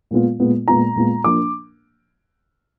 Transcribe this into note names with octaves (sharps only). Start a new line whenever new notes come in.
A#2 G#3 B3 F4
A#2 G#3 B3 F4
A#2 G#3 B3 F4 A#5
A#2 G#3 B3 F4
F3 A#3 D4 D6